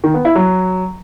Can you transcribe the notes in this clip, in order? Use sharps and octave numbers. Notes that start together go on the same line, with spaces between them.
D#3
B3
E4
F#3